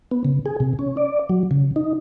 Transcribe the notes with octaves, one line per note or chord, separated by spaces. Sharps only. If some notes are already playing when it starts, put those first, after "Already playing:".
B3
C#3
G#4
C3
C#4
D5
F#3
C#3
D#4